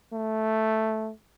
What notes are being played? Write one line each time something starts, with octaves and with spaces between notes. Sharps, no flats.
A3